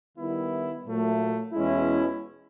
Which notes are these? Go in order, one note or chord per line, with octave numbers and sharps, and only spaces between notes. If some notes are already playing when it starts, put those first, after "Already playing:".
D#3 G3 B3 E4
A#2 F#3 A3
E2 B2 G#3 C#4 E4